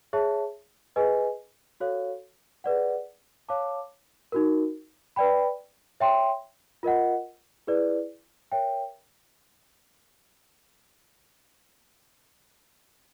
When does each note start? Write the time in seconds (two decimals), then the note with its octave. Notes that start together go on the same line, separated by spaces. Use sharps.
0.13 G#4 C#5 E5 A5
0.96 G#4 B4 D#5 G#5
1.80 F#4 A4 C#5 F5
2.64 G#4 B4 D5 F#5
3.49 C#5 F5 A5 D6
4.32 D#4 F#4 A#4
5.16 B4 D5 G5 B5
6.00 C#5 E5 G5 C6
6.83 F4 A#4 D#5 F#5
7.67 E4 G#4 B4 D5
8.52 A#4 C#5 E5 G5